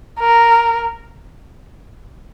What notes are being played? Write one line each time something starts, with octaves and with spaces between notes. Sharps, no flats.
A#4